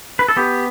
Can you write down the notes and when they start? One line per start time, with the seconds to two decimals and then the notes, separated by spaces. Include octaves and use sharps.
0.19 B4
0.29 A4
0.36 B3 G4